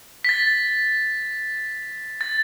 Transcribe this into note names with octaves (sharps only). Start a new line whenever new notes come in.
B6
A6
A6